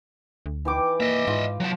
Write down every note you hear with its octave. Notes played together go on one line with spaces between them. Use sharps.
D2
E3 G5 D6
A#3 D#5 E5
G#2 F4
F#3 A5